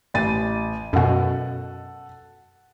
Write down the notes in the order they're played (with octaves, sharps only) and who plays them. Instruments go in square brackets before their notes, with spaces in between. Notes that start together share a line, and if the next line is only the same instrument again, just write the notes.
[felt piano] A1 A6 D#7
[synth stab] F#2 B2 [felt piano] A4 F#5